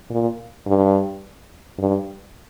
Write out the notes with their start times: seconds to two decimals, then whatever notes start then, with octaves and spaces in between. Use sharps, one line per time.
0.10 A#2
0.67 G2
1.79 G2